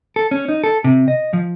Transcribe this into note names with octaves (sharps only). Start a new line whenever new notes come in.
A4
C#4
D#4
A4
C3
D#5
F3